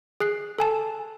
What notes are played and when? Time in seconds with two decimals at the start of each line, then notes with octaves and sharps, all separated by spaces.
0.20 G#4 F#6 C7
0.59 A4 G#5 A5